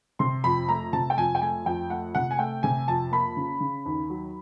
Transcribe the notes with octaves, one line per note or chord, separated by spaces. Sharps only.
C3 C6
F2 B5
A3 A#5
C3 A5
G5
F2 G#5
G5
A3 G#5
F2 G5
A3 F#5
C3 F#5
G#5
A3 G5
C3 G#5
F2 A5
A#3 B5
C#3
C#3
D#2
F#3